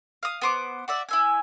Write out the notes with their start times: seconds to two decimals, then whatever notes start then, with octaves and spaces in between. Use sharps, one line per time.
0.23 F5 D#6
0.42 B3 C5 D6
0.88 F#4 D5 E5
1.09 E4 E5 G#5